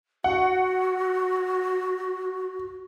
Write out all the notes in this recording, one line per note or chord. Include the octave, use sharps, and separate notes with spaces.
F#4 F#5